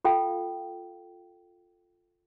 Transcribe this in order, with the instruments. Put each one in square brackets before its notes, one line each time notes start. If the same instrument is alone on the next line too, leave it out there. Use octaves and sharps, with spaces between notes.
[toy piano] F4 A4 F5 G5